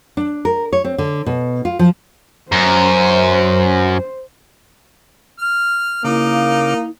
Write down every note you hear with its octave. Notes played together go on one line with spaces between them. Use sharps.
D4
A#4
C#5
C4
D3
B2
F4
F3
F#2 C5
F6
C#3 A#3 D#4 E4 F5 D6